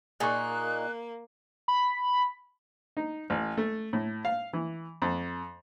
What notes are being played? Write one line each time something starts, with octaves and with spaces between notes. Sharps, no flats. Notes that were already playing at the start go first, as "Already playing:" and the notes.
A#2 A#3 D#4 G#4 C#6 F#6
B5
D#4
A1
A3
A2
F5
E3
F2